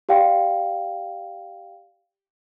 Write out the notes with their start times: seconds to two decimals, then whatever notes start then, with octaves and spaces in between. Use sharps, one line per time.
0.09 G4 D5 F5 G5